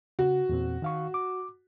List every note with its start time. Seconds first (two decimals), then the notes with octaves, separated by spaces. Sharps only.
0.19 C#3 F#4
0.49 E2 A#2 C4
0.82 D#3 F5 C#6
1.14 D6